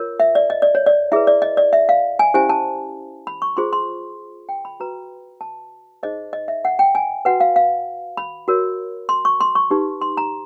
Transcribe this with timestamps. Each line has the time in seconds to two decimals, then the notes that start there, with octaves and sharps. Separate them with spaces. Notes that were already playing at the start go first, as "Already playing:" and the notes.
Already playing: F4 A#4 C#5
0.20 E5
0.35 D5
0.50 D#5
0.62 D5
0.75 C#5
0.86 D5
1.12 E4 G#4 B4 E5
1.27 D5
1.42 D#5
1.57 D5
1.73 E5
1.89 F5
2.19 G#5
2.34 C#4 E4 G4 C5 G#5
2.49 A5
3.27 B5
3.42 C#6
3.57 F4 G#4 C5 C6
3.73 C6
4.49 G5
4.65 B5
4.80 F#4 B4 A#5
5.41 A5
6.03 D#4 G#4 C5 D#5
6.33 D#5
6.48 E5
6.65 F#5
6.79 G5
6.95 G#5
7.25 F#4 B4 F#5
7.40 F5
7.56 F5
8.17 B5
8.48 F#4 A#4 C#5
9.09 C6
9.25 C#6
9.41 C6
9.55 C#6
9.71 D#4 G4 B4
10.01 C6
10.17 A#5